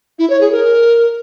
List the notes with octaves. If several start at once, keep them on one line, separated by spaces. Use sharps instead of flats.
E4
C#5
G#4
A#4